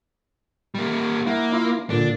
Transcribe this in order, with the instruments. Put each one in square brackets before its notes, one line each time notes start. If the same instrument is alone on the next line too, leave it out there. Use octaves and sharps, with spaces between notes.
[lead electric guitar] G3 A#3
[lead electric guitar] A#3 [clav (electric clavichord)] E4 E5 F#5
[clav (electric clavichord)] E4 F4 E5
[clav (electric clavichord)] A#2 D3 [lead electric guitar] D4